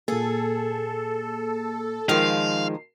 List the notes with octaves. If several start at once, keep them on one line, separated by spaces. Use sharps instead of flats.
A#2 A#3 G#4 A4
D#3 F3 G#3 F5 C7